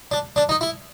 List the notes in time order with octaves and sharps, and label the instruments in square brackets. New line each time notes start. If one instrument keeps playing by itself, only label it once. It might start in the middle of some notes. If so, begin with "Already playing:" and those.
[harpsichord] D4
D4
D#4
E4